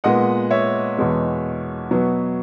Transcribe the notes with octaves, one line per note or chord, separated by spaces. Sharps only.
A#2 G#3 B3 D#5 F#5
C#5 E5
E2 B2 G#3 B3
B2 F#3 B3